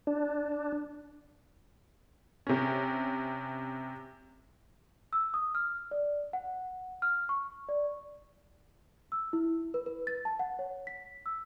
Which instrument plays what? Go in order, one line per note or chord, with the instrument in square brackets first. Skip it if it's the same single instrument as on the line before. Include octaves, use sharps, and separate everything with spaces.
[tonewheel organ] D4
[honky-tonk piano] C3 C#4
[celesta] E6
D#6
F6
D5
F#5
F6
C#6
D5
E6
E4
B4
B4
A6
A5
F#5
C#5
B6
E6